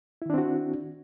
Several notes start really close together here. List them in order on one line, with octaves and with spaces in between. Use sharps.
E4 D#3 D4 C4 F#4